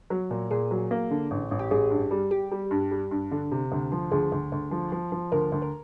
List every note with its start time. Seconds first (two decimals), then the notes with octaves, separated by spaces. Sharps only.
0.10 F#3
0.31 A#2
0.51 A#2 G#4
0.71 F#3
0.91 A#3
1.11 D3
1.31 A1
1.51 A1
1.59 G4
1.71 A1 G#4
1.91 G2
2.11 G3
2.31 G3 G4
2.51 G3
2.71 G2
2.91 G3
3.11 G2
3.31 D3
3.52 C3
3.72 D2
3.92 F3
4.11 D2 G#4
4.32 D2
4.52 D2
4.71 F3
4.92 F3
5.12 F3
5.32 D2 A#4
5.52 D2
5.62 A#4